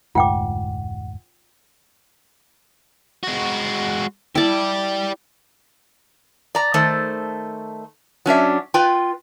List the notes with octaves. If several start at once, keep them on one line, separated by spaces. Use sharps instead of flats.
F1 D2 G#2 F4 F#5 G5 D6
G#3 F#4
E4 G4 D5 A5
D5 A#5
D#3 A3 A4 C5
F#3 C#4 D4 E5
F4 B4 G5